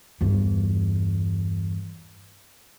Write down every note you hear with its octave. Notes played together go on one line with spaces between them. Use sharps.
E2 G2